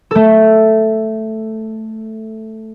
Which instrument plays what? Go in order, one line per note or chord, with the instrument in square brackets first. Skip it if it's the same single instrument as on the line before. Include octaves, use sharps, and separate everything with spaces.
[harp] A3 A4